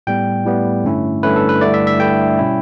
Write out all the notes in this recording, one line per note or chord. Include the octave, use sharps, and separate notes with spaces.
A2 G3 B3 G5
A2 G3 B3
G2 D3 A3 C#4 E4
G2 D3 A3 C#4 E4 B4
A4
B4
G2 D3 A3 E4 D5
E5
E5
G2 D3 A3 E4 G5
B2 G3 C#4 E4